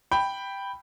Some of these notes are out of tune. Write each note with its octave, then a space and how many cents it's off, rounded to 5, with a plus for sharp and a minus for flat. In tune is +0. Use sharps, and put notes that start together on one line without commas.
G5 +0 B5 +0